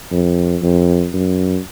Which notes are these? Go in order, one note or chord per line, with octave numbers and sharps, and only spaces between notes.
F2
F2
F#2